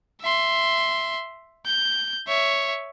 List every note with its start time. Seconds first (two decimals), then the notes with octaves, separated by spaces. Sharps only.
0.21 E5 C6
1.66 G6
2.27 C#5 E5